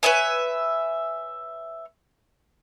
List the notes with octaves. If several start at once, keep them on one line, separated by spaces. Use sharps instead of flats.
B4 C#5 E5 G#5